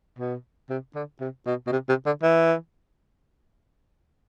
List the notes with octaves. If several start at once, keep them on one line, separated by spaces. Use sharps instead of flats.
B2
C3
D3
C3
B2
B2
C3
C3
D3
E3